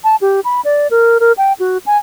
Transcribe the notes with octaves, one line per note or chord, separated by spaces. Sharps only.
A5
G4
B5
D5
A#4
A#4
G5
F#4
G#5